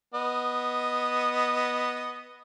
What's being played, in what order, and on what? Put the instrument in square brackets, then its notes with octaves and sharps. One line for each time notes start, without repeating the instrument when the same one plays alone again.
[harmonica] B3 D#5